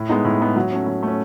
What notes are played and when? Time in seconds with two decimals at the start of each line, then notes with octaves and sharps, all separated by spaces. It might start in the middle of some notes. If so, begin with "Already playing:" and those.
Already playing: A2
0.09 G#3 B3 D#4
0.25 A2
0.41 G#3 B3 D#4
0.56 F#3
0.72 A3 C#4
0.87 F#3
1.03 A3 C#4